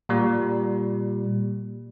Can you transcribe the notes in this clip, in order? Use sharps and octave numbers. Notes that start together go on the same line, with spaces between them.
A#2 G3